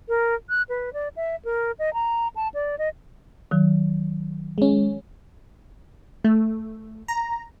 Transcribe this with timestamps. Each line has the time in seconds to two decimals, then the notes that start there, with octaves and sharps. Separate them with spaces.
0.08 A#4
0.49 F#6
0.69 B4
0.93 D5
1.16 E5
1.45 A#4
1.79 D#5
1.94 A#5
2.36 A5
2.54 D5
2.78 D#5
3.51 D#3 F#3
4.58 G#3 C#4
6.24 A3
7.08 A#5